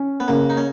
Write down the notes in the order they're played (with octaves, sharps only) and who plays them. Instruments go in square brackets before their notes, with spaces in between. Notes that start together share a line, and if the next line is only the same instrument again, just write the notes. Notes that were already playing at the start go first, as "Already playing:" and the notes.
Already playing: [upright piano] C#4
[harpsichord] B3
[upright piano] C#3 [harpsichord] A#3
[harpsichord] D#4
C#4